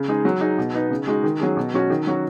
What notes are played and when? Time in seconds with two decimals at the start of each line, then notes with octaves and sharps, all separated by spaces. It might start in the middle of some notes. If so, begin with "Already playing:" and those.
Already playing: C#3
0.08 G#3 D#4 G#4
0.25 F#3
0.41 D#4 G#4
0.58 B2
0.74 B3 D#4
0.91 C#3
1.07 G#3 D#4 F#4
1.23 D#3
1.40 F#3 C#4 G#4
1.57 B2
1.74 F#3 C#4 F#4
1.90 D#3
2.07 F#3 C#4 F#4